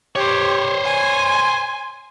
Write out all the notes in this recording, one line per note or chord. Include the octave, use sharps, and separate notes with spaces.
G4 C5 C#5
G#5